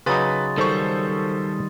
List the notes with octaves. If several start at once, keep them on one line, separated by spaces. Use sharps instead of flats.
C#3 F#3 D#4 B4 C6 D#6 A6
D#3 G3 A4 C5 C#6